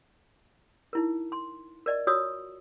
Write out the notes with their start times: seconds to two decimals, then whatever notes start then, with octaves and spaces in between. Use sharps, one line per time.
0.93 D#4 E4 A#4
1.32 C6
1.86 A#4 D5 D#5
2.07 F4 F#4 C#5 D#6 E6